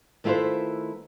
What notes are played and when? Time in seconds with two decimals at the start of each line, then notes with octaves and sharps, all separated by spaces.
0.24 D#3 A3 E4 F4 B4 C5